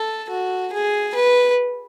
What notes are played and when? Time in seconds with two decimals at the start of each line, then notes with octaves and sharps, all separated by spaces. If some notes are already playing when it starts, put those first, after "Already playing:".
Already playing: A4
0.30 F#4
0.73 G#4
1.15 B4